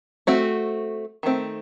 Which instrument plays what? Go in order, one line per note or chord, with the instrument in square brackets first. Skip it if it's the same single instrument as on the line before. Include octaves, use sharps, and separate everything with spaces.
[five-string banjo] A3 C4 F#4
D#3 A3 C4